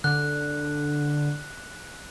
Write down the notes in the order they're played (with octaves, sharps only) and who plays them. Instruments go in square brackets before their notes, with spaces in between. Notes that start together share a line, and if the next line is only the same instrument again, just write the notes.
[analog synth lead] D3 [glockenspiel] F#6